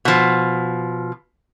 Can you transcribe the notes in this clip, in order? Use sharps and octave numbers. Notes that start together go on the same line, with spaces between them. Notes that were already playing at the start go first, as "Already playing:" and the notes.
B2 F3